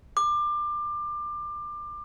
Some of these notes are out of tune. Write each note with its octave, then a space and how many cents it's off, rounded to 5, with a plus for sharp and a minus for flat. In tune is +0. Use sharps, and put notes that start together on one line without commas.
D6 +25